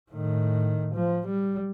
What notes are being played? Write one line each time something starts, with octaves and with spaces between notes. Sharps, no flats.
A2 D#3
F3
G3